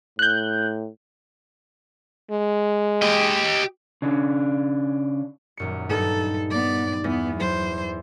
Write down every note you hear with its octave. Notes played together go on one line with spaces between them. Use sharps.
A2 F#6 G6
G#3
G4 D#5
C#3 D4
D#1 F#2 C#7
G2 D#4 A4
B3 D5
E2 B3
F#3 C5